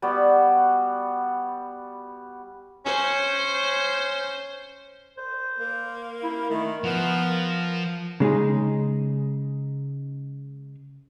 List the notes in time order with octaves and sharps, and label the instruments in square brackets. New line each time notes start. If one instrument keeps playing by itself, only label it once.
[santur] G3 B3 F#4 G4
[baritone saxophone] C#4 [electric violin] C5
[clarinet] C5
[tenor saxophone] A#3
[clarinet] E4
[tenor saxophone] D#3 [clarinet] A3
[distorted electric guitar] F3 [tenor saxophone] B3 [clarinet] A#4
[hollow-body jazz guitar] C#3 G#3 D#4 G#4